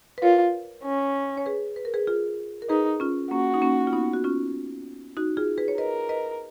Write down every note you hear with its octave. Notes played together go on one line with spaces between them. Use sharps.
B4
F4 A#4 C#5
C#4
C#5
G#4 B4
B4
A#4
G#4 B4
F4 G#4
A#4
D#4 G#4 B4
C#4 F4
A#3 C#4 F#4
D#4
A#3 C#4
F4
B3 D#4
F#4
C#4 F4
D#4 F#4
F4 G#4
G#4 B4
C#5
A#4 B4 D#5
B4 D#5